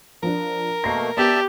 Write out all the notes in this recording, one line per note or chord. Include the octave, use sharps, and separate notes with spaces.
F3 D4 A#4
B2 A3 A#3 A#6 C7
B3 G4 D5 E5 A5